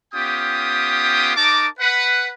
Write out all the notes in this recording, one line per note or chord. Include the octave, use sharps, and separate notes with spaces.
B3 C#4 F4 G4 G5 D#6
D#4 A#4 A5 D6
B4 F#5